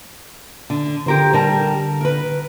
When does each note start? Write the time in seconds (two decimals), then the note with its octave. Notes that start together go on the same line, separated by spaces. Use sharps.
0.70 D3
1.06 D3 G4 A#4 C5
1.33 G3 A#4 A5
2.01 A#4 B4